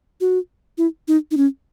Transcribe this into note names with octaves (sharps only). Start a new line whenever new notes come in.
F#4
E4
D#4
D#4
C#4